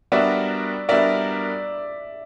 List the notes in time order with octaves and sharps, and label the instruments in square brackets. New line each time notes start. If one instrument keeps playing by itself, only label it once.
[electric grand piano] G3 B3 D4 F#4 A#4 [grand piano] D5 E5
[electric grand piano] G3 B3 D4 F#4 A#4 [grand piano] D5 E5